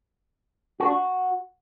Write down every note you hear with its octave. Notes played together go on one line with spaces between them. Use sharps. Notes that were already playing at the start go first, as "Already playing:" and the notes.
F#4
D4
F#4